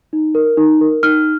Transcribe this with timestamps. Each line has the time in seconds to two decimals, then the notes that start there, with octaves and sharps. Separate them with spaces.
0.13 D#4
0.35 A#4
0.57 D#4
0.81 A#4
1.03 D#4 F6